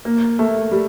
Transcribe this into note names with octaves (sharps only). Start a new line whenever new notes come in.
A#3
A3
G3